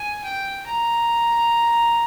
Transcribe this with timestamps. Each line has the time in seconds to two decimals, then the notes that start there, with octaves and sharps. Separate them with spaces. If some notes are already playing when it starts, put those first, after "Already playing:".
Already playing: G#5
0.24 G5
0.67 A#5